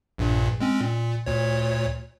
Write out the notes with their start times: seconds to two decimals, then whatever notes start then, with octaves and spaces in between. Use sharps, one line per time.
0.18 A#1 G2 A#2
0.60 G#3 C4 C#4
0.81 A#2
1.26 D2 A#2 C#5